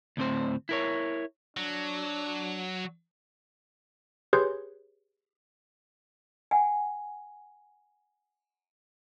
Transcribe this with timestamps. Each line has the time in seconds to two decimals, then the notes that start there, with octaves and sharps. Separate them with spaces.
0.17 D2 A2 C4 C5
0.69 E4 A#4 C#5
1.57 F#3 D4
4.33 G4 G#4 B4 C#5 C6 G6
6.51 F#5 G#5